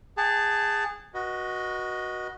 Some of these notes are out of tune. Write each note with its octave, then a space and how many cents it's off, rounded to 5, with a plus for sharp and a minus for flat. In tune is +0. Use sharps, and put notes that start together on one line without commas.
G#4 -15 F#5 +40 A5 +0
F#4 +0 B4 -35 D#5 +0